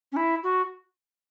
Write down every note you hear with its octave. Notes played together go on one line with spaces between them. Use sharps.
C#4
E4
F#4